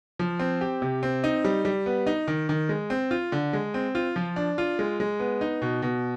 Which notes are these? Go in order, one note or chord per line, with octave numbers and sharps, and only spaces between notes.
F3
C4
G4
C3
C4
D#4
G3
G3
B3
D#4
D#3
D#3
G#3
C4
F4
D3
G#3
C4
F4
F3
D4
F4
G#3
G#3
B3
D#4
B2
B2